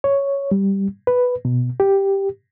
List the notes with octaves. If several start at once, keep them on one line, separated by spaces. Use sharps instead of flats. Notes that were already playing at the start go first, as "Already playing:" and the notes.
C#5
G3
B4
B2
G4